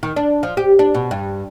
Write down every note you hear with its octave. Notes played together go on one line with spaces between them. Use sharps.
D#3
D4
F3
G4
D4
B2
G2